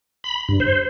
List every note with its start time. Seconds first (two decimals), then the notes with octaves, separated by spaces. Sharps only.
0.24 B5
0.49 G2
0.60 C5